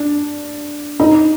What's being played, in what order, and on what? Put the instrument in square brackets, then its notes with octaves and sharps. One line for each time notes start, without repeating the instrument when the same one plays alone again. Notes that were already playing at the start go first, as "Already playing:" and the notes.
Already playing: [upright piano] D4
D#4